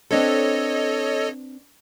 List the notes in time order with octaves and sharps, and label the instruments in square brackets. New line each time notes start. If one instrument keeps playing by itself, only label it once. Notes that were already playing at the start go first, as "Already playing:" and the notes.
[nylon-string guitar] C4 D4 B4 [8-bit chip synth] A4 C#5 D#5